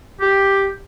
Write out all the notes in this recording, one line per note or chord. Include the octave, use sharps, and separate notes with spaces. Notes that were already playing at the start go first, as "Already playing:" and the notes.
G4